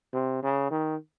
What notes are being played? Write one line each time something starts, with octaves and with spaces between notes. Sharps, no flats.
C3
C#3
D#3